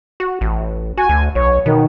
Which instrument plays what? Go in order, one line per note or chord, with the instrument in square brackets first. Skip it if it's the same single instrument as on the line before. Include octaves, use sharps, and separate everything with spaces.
[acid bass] F#4
A1
[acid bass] F#4 [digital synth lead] G#5
[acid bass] D2
[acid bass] B1 [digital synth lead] C#5
[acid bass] B2 [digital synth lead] D#3